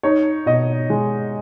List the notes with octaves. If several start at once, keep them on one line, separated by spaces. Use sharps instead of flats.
D#4 C#5
B2 D#5
G#3